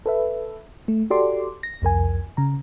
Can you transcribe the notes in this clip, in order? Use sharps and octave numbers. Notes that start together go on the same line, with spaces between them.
A4 B4 E5
A3
F#4 G4 A4 D5 C6 D6
A#6
C2 F2 A#4 G#5
C#3 A#5